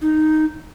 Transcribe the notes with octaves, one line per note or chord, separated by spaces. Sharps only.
D#4